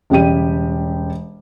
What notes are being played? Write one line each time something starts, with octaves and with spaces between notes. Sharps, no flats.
E1 C#3 G3 G4 D#7